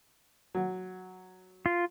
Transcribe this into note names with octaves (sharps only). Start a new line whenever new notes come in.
F#3
F4